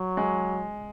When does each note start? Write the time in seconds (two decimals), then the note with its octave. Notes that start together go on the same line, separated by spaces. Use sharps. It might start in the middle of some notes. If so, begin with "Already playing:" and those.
Already playing: F#3
0.17 G#3